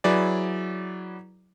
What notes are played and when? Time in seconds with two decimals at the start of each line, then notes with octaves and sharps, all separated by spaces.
0.04 F#3 E4 G#4 B4 D5